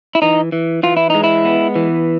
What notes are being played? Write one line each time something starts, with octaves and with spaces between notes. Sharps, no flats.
E4
E3 D#4
E3
E3 F4
E4
G#3 D#4
E4
B3
E3